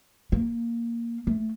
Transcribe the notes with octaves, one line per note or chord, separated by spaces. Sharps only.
A#3
A3